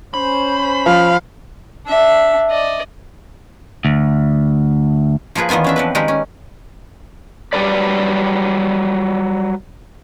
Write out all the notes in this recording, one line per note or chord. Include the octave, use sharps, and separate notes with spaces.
C#4 C5 B5
F3 F5
D4 E5
D5 D#5
D2
F3 A#3 F4 G#4 B4
E2 D#3 B3 F4 G#5
C#4 D4 E5
F3 C4 B4
D#3 G#3 G4 A#4 B4 D#5
C#4
F#3 G3 G4 A#4 B4 D5